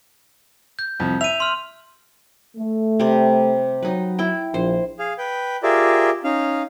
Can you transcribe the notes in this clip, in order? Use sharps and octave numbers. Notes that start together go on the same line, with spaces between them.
G6
C2 F2
E5 D#7 F7
C6 F6
A3
C3 G3
F#3 D#4 B4
E4 G5
A#1 C5
G#4 F5
B4 G5
F4 G4 G#4 A#4 D5 E5
C#4 D#4 F5